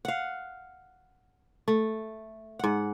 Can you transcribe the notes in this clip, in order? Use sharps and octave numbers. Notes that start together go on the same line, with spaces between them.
F5 F#5
A3
G#2 F#5